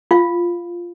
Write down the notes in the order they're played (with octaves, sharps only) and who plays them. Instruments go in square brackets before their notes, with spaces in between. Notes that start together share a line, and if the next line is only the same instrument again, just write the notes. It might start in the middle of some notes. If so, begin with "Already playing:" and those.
[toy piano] F4 F5